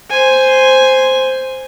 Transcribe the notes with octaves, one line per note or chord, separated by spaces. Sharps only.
C5 G#5